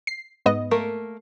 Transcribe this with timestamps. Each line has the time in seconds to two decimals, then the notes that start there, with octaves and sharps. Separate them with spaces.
0.07 C7
0.46 G#2 B3 D#5
0.71 A3 A#3 A#4